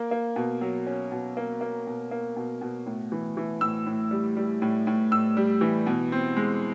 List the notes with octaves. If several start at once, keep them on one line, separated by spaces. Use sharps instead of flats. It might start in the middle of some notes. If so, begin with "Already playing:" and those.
Already playing: A#3
A#3
B2
F#3
C#4
B2
A#3
A#3
B2
A#3
B2
B2
A2
E3
E3
A2 E6
A2
G3
G3
A2
A2
A2 E6
G3
E3
B2
C4
G#3